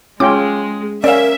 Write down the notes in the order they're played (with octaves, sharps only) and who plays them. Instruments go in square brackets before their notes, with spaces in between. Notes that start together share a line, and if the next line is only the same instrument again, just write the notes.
[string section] G#3 [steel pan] C#4 F4 G5 [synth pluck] D6
[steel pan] C#4 [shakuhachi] A#4 [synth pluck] D5 F5 [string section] E5